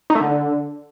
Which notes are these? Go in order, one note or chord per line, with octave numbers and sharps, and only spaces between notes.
D#4
A3
D3